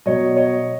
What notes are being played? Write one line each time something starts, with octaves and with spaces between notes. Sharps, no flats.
B2 F#3 C#5 D#5
C#5 D#5